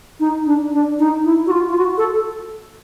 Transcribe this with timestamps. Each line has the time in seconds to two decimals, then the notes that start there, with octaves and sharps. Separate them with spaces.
0.20 D#4
0.46 D4
0.73 D4
0.99 D#4
1.25 E4
1.47 F#4
1.51 F4
1.69 F4
1.78 F#4
1.98 A4